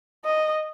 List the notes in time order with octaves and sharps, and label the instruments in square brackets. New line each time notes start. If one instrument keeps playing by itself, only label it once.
[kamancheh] D#5